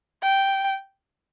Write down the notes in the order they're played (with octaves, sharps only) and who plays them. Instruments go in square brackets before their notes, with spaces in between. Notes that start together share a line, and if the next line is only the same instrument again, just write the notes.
[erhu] G5